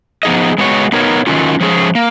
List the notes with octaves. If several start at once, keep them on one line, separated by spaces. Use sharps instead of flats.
F3 B3 D#4 G#4 D#5
G#3 B3 F#4 C#5
B3 D#4 A#4 C#5
D#3 F#3 C#4 F4
F3 G#3 C#4 G#4
A#3